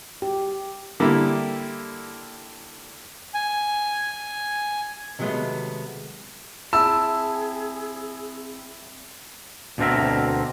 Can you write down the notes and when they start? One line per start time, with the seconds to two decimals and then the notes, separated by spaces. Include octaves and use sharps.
0.22 G4
1.00 D3 G3 A#3 E4 G4
3.34 G#5
5.19 C3 D#3 F#3 G#3 A3 B3
6.73 C4 E4 G#4 A5 E6
9.78 D2 B2 D3 C4 A#4 E5